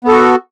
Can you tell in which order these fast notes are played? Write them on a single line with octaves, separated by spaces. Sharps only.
B3 A4 F#4